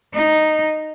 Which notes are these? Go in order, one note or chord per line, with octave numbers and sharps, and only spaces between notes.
D#4